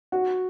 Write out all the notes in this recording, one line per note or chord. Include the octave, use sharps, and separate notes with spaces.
F#4